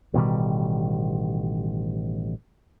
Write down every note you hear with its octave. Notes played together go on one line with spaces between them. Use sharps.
A1 B2 D#3 G3